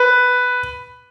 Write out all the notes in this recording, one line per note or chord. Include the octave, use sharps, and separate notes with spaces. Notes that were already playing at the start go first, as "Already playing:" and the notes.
Already playing: B4